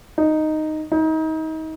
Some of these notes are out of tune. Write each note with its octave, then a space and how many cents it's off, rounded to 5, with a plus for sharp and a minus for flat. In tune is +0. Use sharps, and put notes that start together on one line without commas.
D#4 -5
D#4 +30